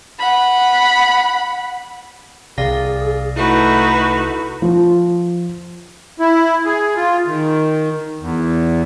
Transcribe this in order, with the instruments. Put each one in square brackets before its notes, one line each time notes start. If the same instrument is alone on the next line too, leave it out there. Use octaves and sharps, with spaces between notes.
[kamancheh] F#5 B5
[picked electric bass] C2 C3 [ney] G#4 [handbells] D5 F5 A#6
[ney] A3 [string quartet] D#4 F#4 B4 [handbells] E4 A4
[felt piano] F3
[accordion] E4
G#4
F4
D#3
E2